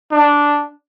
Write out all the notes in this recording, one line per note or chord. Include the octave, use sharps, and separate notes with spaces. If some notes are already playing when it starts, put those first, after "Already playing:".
D4